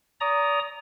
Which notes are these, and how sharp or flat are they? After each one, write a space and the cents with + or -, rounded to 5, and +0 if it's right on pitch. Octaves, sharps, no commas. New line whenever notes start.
D5 -35 A#5 +0 D#6 +0